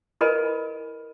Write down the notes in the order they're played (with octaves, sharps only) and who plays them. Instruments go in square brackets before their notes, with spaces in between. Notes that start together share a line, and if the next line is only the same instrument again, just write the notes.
[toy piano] E4 A#4 B4 D#5 G#5 B5